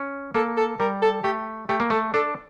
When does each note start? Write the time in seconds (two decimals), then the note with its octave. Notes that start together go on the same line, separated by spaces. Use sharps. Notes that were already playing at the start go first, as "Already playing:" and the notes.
Already playing: C#4
0.35 A#3 A4
0.57 A4
0.80 G3 A#4
1.02 A4
1.24 A3 G4
1.69 A3 G4
1.80 A#3
1.90 A3 A4
2.14 D4 A4